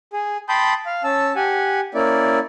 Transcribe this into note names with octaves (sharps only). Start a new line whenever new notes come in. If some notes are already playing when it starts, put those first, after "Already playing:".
G#4
G5 A5 B5 C6 D#6 G6
F5
C#4 A5 E6
G4 F#5 G#5
A#3 C#4 E4 D5